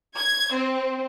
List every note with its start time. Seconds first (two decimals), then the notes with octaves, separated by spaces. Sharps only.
0.19 G#6
0.54 C4